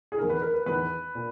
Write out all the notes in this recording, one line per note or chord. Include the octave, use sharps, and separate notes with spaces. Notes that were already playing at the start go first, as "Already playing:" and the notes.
G#4
E2 D#3 A#4
B4
A#4
B4
E2 D#3 B4
A#2